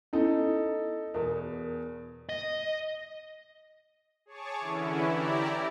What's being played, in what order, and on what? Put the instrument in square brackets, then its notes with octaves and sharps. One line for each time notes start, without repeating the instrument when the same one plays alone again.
[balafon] B3 C#4 E4 [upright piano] D#4 A4 D#5
[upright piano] E2 B2 [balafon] A#4
[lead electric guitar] D#5
[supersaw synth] G#4 C#5 A5 C#6 D6
D3 E3 C#4 E4
E4 G4 D5 A#5